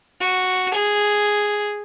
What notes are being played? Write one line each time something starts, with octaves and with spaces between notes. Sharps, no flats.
F#4
G#4